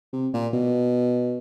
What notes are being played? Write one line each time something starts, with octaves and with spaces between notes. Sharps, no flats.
C3
A#2
B2